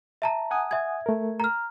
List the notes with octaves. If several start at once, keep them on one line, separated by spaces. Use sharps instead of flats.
E5 A5 A#5
F#5 G#5 D#6
E5 G#6
A3 A#4
A#5 F6